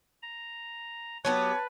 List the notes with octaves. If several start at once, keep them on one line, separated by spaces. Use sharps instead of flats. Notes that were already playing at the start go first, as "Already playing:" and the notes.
A#5
F#3 B3 G4 B4 C#5 A5